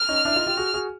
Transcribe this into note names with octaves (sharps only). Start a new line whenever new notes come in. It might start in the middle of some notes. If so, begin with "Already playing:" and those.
Already playing: F6
C#4 D#4
D4 E4
D#4 F4
F4 G4
F#4 G#4
F#4 G#4